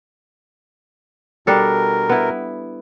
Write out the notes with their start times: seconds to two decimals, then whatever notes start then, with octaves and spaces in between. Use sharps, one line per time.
1.47 B2 G3 D4 A4 A#4
2.09 B3 E4